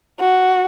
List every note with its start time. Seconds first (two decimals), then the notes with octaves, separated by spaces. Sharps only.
0.20 F#4